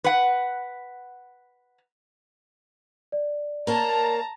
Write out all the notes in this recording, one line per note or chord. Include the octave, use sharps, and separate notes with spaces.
B4 F#5
D5
A#3 A#4 C#5 A5 A#5